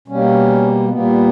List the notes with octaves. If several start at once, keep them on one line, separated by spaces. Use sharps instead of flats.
B2 G3 A#3 C#4
A#2 G3 A#3 B3